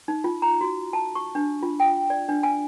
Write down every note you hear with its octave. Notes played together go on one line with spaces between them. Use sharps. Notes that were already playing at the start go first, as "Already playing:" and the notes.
D#4
F4
A#5
F#4
A5
C#6
D4
F4
G5
D5
D4
G#5